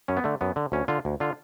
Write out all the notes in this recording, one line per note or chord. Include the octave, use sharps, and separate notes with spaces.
F#2 C#4
B3
D3 A3
F#2 B3
D3
D2 C#4
D3 F4
D2
D3 F4